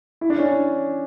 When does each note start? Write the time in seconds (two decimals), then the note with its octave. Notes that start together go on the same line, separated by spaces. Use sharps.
0.21 E4
0.30 D4
0.38 C#4
0.46 D4